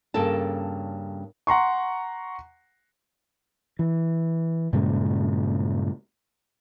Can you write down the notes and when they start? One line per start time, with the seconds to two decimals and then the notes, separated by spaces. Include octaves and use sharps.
0.14 G2 C#3 A#3 C#4 A4 A5
1.47 F#5 A#5 C6 C#6
3.79 E3
4.73 G2 A#2 C#3 G#3